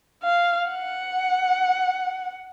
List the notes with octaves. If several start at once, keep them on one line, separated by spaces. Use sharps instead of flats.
F5
F#5